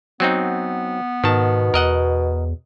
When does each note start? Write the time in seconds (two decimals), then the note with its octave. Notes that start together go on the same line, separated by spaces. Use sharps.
0.20 F#3 B3 C4 D#4
1.24 G#2 B2 D#3 A5
1.74 E2 A#4 D#5 F#5